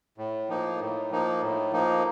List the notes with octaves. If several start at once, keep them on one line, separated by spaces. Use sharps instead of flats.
A2
F3 A#3 D#4
A2
F3 A#3 D#4
A2
F3 A#3 D#4